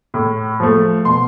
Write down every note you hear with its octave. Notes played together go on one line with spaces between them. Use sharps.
A2
F3 A3
B2 C6